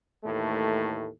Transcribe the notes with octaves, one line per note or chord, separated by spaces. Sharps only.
D#2 A2 E3 A3